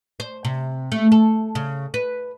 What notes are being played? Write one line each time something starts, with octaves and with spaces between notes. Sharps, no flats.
C5
C3
A3
A4
C#3
B4